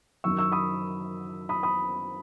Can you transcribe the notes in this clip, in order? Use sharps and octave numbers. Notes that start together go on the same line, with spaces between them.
F#2 D#3 F#3 C#6 E6
C#6 E6
B5 D#6
B5 D#6
B5 D#6